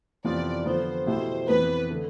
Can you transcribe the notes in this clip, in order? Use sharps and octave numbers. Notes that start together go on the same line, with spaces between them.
F2 C3 E3 B3 F4 D5
D3 F3 B3 F4 C5
B2 A3 E4 G4 C5
F2 E3 B3 B4
D3 A3